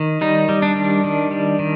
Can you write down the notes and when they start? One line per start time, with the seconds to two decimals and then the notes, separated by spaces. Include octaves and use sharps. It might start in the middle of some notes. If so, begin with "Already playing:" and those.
Already playing: D#3
0.21 G3 D#4
0.49 G3
0.62 D4
0.76 D#3
1.04 D#3
1.31 G3
1.59 D#3